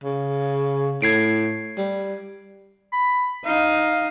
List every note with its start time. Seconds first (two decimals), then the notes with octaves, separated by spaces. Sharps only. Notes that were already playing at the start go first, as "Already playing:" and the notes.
0.04 C#3
1.02 A2 G#6 C7 D7
1.78 G3
2.93 B5
3.45 D#4 F5